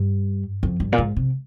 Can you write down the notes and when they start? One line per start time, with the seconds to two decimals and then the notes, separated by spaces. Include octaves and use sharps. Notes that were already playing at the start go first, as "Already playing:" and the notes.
Already playing: G2
0.63 F2
0.80 G2
0.92 A#2
0.98 G#2
1.16 C3